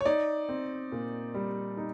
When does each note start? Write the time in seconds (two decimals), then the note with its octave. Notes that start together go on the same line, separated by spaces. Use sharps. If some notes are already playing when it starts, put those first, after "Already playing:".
0.01 C#5
0.05 D#4 D5
0.49 C4
0.92 A#2
1.34 G3
1.77 D#4